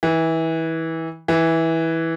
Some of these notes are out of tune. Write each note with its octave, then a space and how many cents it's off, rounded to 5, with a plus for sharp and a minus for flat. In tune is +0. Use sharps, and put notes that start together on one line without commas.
E3 -25
E3 -15